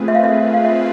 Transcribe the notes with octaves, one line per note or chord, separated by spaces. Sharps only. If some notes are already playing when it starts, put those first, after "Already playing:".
Already playing: A3 C4 F4 G#4 B4
E5
F5
E5
F5
E5